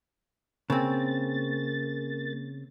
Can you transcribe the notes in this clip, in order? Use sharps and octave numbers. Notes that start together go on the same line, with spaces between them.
C#3 A#3 C4 A6